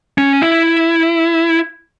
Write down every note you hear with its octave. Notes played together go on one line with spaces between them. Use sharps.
C#4
E4